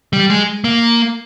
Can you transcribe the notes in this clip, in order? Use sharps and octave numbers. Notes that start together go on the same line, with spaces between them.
G3
G#3
A#3